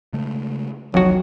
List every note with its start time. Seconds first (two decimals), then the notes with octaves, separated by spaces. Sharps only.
0.13 C#3 G#3 A3
0.94 F1 C2 F2 D#3 F#3 F#4